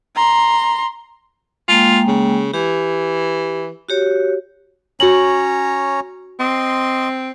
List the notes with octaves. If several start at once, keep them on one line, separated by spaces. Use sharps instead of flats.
A#5 C6
G#3 A#3 F4 G5
C#3
E3 G4
F#4 G4 C#5
C#4 F#4 C#5 A#5 F#7
C4 D#5 C6